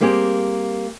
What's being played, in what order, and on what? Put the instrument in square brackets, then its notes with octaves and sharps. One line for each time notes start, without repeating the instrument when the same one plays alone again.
[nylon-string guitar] G3 A#3 C4 G4 G#4